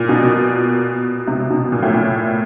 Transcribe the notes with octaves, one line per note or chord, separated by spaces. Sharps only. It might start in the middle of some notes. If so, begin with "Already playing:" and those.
Already playing: A#2
B2
B2
C3
B2
A#2
A2
A#2